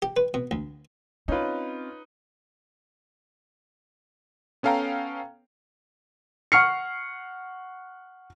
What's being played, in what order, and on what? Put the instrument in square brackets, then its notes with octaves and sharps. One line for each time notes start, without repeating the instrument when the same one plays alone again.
[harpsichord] G4
B4
B2
D2
[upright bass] C4 [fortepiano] C#4 F4 [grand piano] D#4 B4
[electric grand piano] B3 C#4 A4 F5 G5 A#5
[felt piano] F#5 C#6 F6 C7 C#7